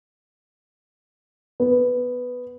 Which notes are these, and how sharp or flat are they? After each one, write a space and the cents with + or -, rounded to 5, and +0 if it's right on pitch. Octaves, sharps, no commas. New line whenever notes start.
B3 +5